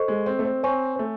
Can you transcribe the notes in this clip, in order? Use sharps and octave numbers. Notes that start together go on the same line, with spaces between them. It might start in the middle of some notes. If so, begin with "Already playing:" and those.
Already playing: A4 C5 D#5 C#6
G#3
C4
A3
C4
C4 C#5 G#5 C#6
C4
A3